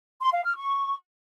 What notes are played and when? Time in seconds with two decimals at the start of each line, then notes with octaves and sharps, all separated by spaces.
0.21 C6
0.33 F5
0.44 F6
0.56 C#6